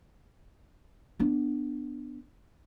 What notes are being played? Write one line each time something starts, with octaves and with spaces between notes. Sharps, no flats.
B3 D4